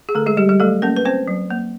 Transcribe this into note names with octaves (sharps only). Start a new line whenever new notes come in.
G#4
D3 A3 A4
G#3 G#4
G3 G4
G3 G4
F#3 A3 A4
A#3 C#4 A#4
B4
C4 C#4 C5
F#3
A#3